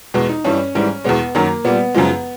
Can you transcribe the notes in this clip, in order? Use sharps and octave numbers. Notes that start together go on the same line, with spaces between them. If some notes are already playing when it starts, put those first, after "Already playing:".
E2 B2 G#3
D#4
G2 E3 G3 C#4
G#2 E3 G3
E2 B2 G#3 B3
F#2 D#3 F#3 A#3
A#2 G3 B3
F#2 C#3 F3 G#3